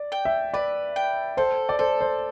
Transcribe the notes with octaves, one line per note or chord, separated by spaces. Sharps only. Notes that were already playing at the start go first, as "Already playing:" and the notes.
Already playing: D5
G5
E5
B4 D5
G5
A4 C5
D5
A4 C5
C5